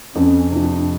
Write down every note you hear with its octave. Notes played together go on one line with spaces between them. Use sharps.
F2 C#4
C3 D4
F3